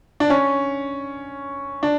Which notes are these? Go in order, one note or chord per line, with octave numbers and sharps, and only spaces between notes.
D4
C#4
D4